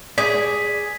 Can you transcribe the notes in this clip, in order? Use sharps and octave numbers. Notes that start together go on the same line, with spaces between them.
G#4 D5 B6